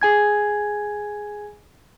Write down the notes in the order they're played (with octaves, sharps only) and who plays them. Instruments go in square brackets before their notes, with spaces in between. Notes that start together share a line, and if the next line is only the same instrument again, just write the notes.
[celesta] G#4 G#5 G#6